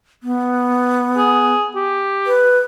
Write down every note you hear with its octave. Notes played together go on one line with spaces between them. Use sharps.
B3
G#4
G4
B4